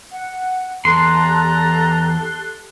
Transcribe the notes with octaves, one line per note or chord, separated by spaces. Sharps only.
F#5
E2 G4 A4 A#5 C6 F#6